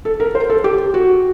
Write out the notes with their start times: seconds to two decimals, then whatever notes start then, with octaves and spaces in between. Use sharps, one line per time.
0.05 A4
0.20 A#4
0.35 C5
0.50 A4
0.64 G4
0.94 F#4